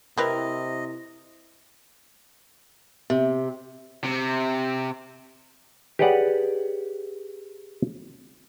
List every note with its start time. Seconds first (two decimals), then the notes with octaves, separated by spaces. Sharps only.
0.18 C3 C4 E4 A#4 B4 D#5
3.10 C3
4.04 C3
5.99 G4 G#4 B4 C#5 D5 F#5